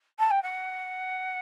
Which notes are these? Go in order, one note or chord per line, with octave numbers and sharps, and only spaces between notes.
A5
G5
F#5